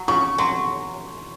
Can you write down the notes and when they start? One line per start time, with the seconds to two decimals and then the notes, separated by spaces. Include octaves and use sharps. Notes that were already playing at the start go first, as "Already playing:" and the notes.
Already playing: F#3
0.08 C#3 C#6
0.38 F#3 C6